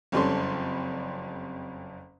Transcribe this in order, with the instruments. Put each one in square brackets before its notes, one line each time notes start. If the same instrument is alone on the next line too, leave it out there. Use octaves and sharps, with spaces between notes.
[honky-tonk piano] F#1 F2 G3 C#4 A4 C6